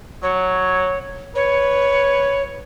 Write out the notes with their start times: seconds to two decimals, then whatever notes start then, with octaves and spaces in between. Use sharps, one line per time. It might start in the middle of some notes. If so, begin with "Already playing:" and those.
0.23 F#3 C#5
1.35 B4 C#5